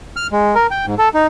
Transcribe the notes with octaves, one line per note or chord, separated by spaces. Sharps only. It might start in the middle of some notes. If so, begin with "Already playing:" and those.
F6
G#3
A#4
G5
G#2
A4
D#4